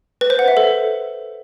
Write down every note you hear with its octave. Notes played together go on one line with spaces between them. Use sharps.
B4
C5
F#5
E5
A4